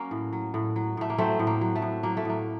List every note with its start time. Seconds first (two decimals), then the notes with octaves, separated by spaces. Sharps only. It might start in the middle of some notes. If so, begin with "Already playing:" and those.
Already playing: F#3 A#3 C#4
0.11 A2
0.33 F#3
0.54 A2
0.76 F#3
0.97 A2 A3
1.10 A#3
1.18 F#3 A3 C4
1.39 A2
1.47 A#3
1.61 F#3
1.76 A3
1.82 A2
2.03 F#3 A#3
2.17 A3
2.25 A2 A#3